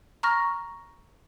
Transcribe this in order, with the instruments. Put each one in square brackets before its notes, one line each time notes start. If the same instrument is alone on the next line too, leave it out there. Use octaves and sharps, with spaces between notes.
[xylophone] A#5 C#6 F6 A#6